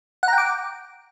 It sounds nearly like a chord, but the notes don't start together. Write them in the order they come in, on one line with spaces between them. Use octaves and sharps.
F#5 A#5 G5 D6